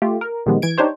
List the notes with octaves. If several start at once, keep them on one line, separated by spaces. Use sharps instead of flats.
A3 F4 G4
A#4
A#2 D#3 F3 G3 G#3 B3
E3 G#6 D7
D4 D#4 G4 C5 C#5